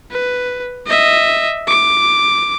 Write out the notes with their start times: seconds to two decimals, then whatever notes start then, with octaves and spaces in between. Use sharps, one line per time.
0.11 B4
0.87 D#5 E5
1.68 D6